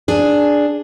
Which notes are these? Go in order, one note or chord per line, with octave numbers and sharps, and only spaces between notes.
D4 G#4